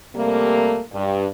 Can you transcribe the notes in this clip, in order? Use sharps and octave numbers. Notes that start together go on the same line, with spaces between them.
C3 G3 A3 A#3
G2